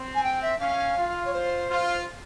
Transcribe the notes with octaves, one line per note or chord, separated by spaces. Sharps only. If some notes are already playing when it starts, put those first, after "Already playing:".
Already playing: C4
G#5
G5
E5
C#4 F5
F4
C#5
C5
F4